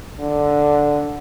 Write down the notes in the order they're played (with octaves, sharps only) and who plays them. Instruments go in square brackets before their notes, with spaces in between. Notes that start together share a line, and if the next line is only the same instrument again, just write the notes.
[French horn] D3